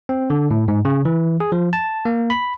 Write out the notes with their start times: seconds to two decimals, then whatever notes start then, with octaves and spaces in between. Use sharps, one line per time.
0.09 C4
0.30 D3
0.51 A2
0.68 G#2
0.85 C#3
1.05 E3
1.40 G#4
1.52 F3
1.73 A5
2.05 A#3
2.30 B5